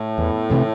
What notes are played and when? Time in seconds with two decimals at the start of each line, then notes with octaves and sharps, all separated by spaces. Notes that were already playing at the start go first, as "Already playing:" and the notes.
Already playing: A2
0.18 E2
0.50 C3 E3 A3